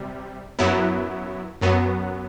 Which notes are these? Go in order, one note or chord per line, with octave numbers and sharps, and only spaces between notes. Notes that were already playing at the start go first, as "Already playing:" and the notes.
Already playing: C3 G3
F#2 F#3 B3 E4
F#2 F#3 B3